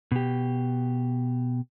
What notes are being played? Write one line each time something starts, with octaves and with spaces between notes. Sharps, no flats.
B2 G4